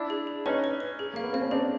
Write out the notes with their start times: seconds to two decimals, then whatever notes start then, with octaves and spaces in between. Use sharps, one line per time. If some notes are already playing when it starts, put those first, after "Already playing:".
Already playing: D4 E4 D5
0.10 G#4
0.27 G#4
0.46 C#4 D#4 B4
0.64 B4
0.80 B4
0.99 G#4
1.14 A#3 F5
1.23 B3
1.33 C4 F5
1.42 C#4
1.51 C4 D4 G#4